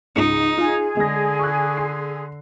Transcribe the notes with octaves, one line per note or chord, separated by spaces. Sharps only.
C#2 G#2 D#4 C#7
F4 G#4
D3 G#3 A#6
C#6 E6 F#6
C6 C7